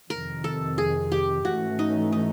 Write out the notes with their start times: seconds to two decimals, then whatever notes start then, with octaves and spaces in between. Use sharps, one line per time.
0.10 F2 C3 D#3 A#4
0.44 A4
0.78 G#4
1.12 G4
1.45 G#2 E3 A3 C#4 F#4
1.79 D#4
2.12 D#4